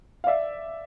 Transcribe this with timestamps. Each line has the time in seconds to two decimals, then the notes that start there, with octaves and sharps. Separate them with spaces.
0.24 F5
0.27 D5 E5